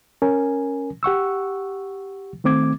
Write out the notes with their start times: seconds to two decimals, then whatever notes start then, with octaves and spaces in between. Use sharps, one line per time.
0.22 C#4 A#4 G#5
1.03 G4 F#5 C#6 E6
2.44 D#3 A3 C4 D6 G#6